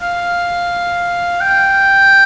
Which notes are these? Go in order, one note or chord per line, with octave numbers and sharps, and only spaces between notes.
F5
G5